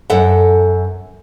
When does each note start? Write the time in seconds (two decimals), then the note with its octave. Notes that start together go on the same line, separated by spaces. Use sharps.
0.10 F#2 A4 E5 F#5